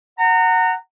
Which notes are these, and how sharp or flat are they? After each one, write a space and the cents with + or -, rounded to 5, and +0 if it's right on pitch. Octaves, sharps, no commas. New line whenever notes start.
F#5 +0 A#5 -25